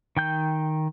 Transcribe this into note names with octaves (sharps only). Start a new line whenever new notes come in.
D#3 G5 G6